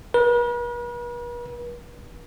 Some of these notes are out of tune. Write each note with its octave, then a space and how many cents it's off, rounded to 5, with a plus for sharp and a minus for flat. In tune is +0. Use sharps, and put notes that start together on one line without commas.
B4 -45